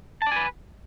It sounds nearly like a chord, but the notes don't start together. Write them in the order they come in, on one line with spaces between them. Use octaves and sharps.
A5 D5 G#5 B4